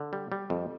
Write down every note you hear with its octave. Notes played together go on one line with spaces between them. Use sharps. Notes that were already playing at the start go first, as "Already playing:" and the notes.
Already playing: D3
G3
G3
F2